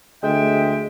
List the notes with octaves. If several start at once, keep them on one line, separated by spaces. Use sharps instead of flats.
D2 G#3 E5 G5